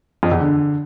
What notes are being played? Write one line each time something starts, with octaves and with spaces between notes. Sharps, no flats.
F2
E2
D3